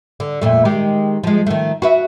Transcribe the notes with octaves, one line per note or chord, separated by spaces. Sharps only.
D3
F2 A#2 A3
D#3 G#3 G4
F3 G#3
D#3 A3
F#4 B4 E5